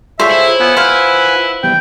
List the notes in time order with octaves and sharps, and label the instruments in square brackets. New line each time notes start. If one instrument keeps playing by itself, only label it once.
[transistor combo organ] F4 G#4 A4 [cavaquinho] C5 C#5 [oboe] E5
[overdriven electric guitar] E4
[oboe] B3 [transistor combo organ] F4 F#5 G#5
[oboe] B4 [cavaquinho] C5 F5
[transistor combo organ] E3 G3 B3 [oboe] G5